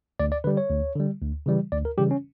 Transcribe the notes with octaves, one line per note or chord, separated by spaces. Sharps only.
D2 D5
D5
D3 G3 B4
C#5
D2
D3 G3
D2
C#3 E3 G3
D2 D5
A#4
C#3 E3 G3 G4
C#4